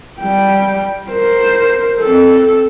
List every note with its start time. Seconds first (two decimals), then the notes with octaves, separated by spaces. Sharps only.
0.20 G3 G5
1.10 A#4 C5
2.00 C4 A4